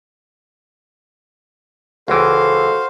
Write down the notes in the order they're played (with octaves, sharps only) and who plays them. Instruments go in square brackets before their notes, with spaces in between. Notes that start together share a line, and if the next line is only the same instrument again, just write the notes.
[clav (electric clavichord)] C#2 E3 [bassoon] F#4 [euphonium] A4 [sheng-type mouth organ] C5 F5